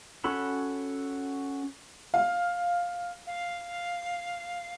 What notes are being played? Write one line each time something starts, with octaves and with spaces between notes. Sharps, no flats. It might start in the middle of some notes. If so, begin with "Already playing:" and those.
C#4 F#4 A4 B5
F5
F5